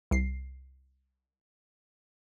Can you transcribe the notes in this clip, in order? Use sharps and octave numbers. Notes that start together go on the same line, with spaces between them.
C2 C7